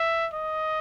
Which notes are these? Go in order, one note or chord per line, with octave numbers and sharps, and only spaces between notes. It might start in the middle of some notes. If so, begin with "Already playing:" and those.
Already playing: E5
D#5